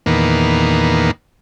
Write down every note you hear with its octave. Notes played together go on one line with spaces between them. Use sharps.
E2 A#2 D#3 A#3 B3